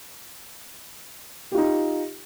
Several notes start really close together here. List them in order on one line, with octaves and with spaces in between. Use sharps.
G4 F4 D#4